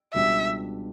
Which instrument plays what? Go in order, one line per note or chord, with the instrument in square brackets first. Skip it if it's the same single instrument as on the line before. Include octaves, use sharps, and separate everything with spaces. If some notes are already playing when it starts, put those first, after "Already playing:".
[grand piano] C#2 B2 G3 D4 [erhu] E5